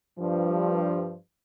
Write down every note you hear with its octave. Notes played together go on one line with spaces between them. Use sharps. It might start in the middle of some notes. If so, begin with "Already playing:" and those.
G2 F3